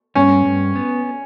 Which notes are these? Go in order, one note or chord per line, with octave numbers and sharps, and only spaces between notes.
G2 C#4
G2
B3